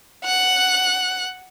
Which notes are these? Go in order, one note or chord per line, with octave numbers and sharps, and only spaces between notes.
F#5 F#6